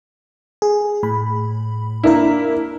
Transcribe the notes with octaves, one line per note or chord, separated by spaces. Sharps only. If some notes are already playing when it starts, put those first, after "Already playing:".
G#4
A2 B5
A#3 D4 E4 A#4